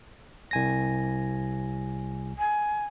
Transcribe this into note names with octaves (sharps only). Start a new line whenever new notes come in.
C2 G#5 A#6
G#5